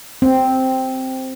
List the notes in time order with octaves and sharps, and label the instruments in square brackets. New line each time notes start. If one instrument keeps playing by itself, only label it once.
[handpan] C4